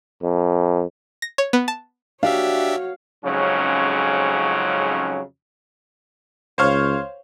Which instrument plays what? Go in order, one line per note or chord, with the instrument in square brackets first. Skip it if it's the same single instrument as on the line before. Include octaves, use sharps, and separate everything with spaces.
[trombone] F2
[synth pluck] A#6
C#5
B3
A5
[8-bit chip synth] D4 G4 E5 [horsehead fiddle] F#4 C#5 [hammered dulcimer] F5
[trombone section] F2 G#2 C#3 F#3 C#4
[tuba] C#2 [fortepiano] C5 C#5 F5